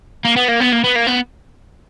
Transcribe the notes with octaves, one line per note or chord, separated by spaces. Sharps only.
A#3
B3
A#3
B3
A#3
B3
A#3
B3